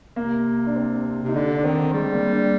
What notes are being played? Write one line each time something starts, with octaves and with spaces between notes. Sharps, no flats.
C3 A#3
D4
C4
C3
D#4
D3 D4
D4
D#3 C4
G3 G#3
A#3
D4